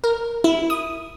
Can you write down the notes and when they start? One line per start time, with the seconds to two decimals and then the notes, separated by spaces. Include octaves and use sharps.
0.04 A#4
0.44 E4
0.70 D#6